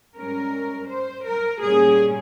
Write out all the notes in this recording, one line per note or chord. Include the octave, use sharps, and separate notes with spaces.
G#2 G3 C#4 A#4
C5
A#4
A#2 G3 A#3 C#4 G#4